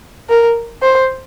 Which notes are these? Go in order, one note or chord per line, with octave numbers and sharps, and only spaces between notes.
A#4
C5